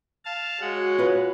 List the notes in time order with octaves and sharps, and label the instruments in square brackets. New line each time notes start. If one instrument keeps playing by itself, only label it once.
[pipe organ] F5 A5
[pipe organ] G#3 F#5 [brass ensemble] F#4 C#5
[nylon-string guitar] F4 B4